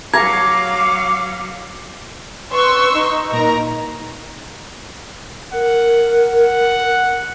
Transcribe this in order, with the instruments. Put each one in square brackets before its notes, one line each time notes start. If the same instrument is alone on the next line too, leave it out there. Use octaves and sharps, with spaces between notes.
[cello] F#3 F5 [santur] A#5 [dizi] D6 [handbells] G#6
[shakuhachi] B4 [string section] C6 C#6 E6
[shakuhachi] D#4
[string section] A#2 A#4 A#5
[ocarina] A#4 [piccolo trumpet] F#5
[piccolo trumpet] F#5